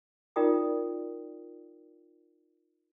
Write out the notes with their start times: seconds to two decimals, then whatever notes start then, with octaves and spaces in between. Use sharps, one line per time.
0.36 D#4 F4 A#4 D5 G5 D#6